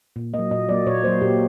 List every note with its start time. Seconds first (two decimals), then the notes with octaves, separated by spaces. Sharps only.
0.16 A#2
0.34 A#3 D#5
0.39 F#3
0.51 A#2 D#5
0.69 F#3 A#3 D5
0.87 A#2 C#5
1.04 F#3 A#3 C5
1.21 A#2 G4